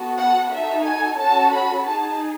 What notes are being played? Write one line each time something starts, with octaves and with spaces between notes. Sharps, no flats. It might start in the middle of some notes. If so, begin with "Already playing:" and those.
Already playing: B3 F#4 A4
F#5
D#4 F#4 A4 E5
G#5
C#4 F#4 A4 A5
B5
D#4 G#4 A5